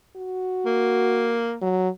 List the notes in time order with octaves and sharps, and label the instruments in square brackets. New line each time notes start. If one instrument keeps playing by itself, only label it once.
[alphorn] F#4
[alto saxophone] A#3
[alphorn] F#3